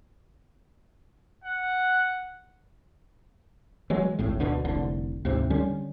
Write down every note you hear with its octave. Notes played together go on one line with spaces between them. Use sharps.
F#5
E3 F#3 G#3
D1 G#1 A2
D2 B2 D3
F1 C2 D3
D2 G#2 C3
D3 G3 C#4